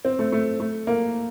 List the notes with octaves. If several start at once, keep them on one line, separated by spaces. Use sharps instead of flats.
C4
A3
A3
A3
A#3